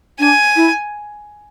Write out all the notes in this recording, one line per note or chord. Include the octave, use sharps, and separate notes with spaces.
D4 G#5
E4